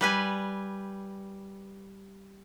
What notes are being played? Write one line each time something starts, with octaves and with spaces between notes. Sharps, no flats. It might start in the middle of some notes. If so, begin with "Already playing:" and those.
G3 B4 G#5